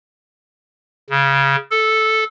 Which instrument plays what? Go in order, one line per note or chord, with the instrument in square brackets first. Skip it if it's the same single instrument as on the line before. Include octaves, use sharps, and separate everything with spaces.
[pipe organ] C#3
A4